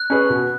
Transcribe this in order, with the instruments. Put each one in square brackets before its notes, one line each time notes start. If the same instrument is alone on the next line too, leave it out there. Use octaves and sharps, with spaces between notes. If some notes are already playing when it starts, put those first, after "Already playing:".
Already playing: [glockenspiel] F#6
[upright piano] C#4 G#4 B4
B2